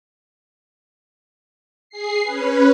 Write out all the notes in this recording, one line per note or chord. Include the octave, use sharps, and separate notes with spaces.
G#4 C7
C#4 B4